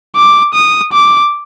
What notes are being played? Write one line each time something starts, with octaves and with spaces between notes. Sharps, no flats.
D6
D#6
D6